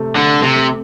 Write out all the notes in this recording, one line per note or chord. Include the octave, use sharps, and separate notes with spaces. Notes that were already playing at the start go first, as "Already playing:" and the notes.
Already playing: C3 A3 C4
D3 A3
C3
A3